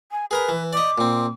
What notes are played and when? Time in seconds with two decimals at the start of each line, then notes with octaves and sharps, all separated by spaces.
0.11 G#5
0.31 G#4 A#4 B4 A#5
0.49 E3
0.73 D5 D#5 D6
0.98 A#2 C4